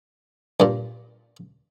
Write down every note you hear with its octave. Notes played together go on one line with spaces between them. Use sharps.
G2 A#2